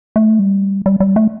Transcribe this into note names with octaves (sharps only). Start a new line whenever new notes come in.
A3
G3
G3
G3
A3